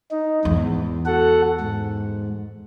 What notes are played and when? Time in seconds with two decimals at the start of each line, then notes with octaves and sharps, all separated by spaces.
0.11 D#4
0.45 E2 G#2
1.06 F#4 A4 F#5
1.61 G#2